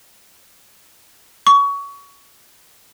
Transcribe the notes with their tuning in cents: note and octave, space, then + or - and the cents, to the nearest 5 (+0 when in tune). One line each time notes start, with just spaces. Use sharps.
C#6 +25